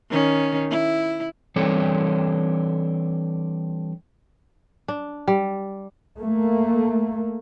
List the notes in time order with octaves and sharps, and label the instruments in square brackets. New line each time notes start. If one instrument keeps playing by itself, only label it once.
[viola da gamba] D#3 C#4
E4
[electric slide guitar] E3 G3 C4 D4 A4 C#5
[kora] D4
G3
[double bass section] A3 A#3